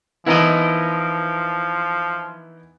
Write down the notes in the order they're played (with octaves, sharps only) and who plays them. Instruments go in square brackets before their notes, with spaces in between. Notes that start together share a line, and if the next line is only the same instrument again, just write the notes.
[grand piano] E3 B3 D#4 [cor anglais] F3 [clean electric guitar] E4 A#4 D#5